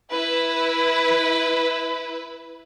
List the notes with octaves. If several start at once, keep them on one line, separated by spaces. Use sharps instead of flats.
E4 B4